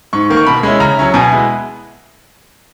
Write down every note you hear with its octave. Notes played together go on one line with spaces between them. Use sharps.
G#2 C#6
D#3 A#3
C#6
B2 B5
G#3 C#4 E4
C#3 A#5
F#3 C#4 E4
B2 G#5
G#3 B3 E4